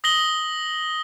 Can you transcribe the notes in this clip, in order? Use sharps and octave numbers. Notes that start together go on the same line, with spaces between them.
D#6 A#6 F#7 G7